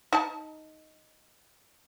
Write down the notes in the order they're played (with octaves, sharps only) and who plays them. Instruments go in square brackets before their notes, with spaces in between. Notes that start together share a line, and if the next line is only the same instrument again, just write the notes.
[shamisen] D#4 A5